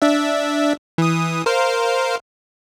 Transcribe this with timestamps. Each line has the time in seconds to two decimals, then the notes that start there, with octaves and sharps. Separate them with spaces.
0.02 D4 E5
0.98 E3 D#6
1.46 A#4 C5 F5